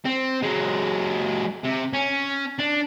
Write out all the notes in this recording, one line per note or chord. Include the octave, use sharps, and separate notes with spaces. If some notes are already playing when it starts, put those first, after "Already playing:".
C4
F#3 G#3
C3
C#4
D4